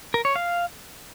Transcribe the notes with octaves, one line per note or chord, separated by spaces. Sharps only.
A#4
C#5
F5